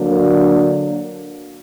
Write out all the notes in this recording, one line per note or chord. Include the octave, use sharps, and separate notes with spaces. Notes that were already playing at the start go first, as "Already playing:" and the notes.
Already playing: D3 F#3 A#3 D4